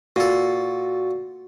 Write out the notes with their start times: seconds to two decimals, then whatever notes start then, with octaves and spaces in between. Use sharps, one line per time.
0.16 A#2 F#4 A4